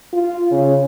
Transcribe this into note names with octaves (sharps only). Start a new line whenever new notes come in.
F4
C#3